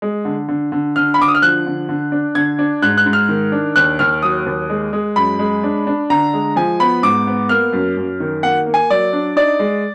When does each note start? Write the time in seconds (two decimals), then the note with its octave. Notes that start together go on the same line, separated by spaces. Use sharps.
0.02 G#3
0.25 D3
0.48 D3
0.72 D3
0.96 D3 F6
1.14 B5
1.18 D3 D6
1.28 D#6
1.35 F6
1.42 F3 F#6
1.66 D3
1.89 D3
2.12 D4
2.35 D3 G#6
2.59 D4
2.82 G#2 F#6
2.98 F#6
3.06 G#2
3.13 F6
3.29 D#3
3.52 D4
3.76 D#2 F#6
3.99 D#2 F6
4.23 F#3 D#6
4.46 D#2
4.70 G#3
4.93 G#3
5.16 F#2 B5
5.39 G#3
5.63 D4
5.87 D4
6.10 D3 A#5
6.33 G#3
6.56 F3 G#5
6.80 B3 B5
7.03 G#2 D6
7.27 B3
7.49 A#3 F6
7.73 F#2
7.97 F#2
8.20 D#3
8.43 A#3 F#5
8.66 A#3
8.74 G#5
8.90 F#3 D5
9.13 D4
9.36 D#4 D5
9.59 G#3